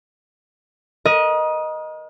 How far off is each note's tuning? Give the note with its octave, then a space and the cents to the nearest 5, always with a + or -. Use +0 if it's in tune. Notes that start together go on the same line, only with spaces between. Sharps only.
A#4 +40 D#5 +0